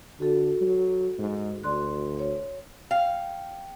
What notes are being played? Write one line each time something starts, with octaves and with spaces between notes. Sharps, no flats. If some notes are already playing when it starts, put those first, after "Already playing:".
D3 F#4 A4
F#3
G#2
D2 D5 C6 F#6
C#5
F5 G5